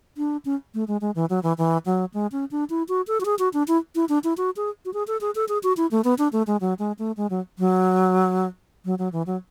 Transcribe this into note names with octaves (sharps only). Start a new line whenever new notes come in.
D4
C#4
A3
G#3
G#3
E3
F#3
E3
E3
F#3
G#3
C#4
D4
E4
F#4
A4
F#4
G#4
F#4
D4
E4
E4
D4
E4
F#4
G#4
F#4
G#4
A4
G#4
A4
G#4
F#4
E4
A3
B3
D4
A3
G#3
F#3
G#3
A3
G#3
F#3
F#3
F#3
F#3
E3
F#3